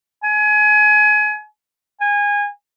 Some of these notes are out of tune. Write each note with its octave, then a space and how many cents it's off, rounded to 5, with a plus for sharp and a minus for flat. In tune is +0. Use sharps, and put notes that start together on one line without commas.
G#5 +25
G#5 -25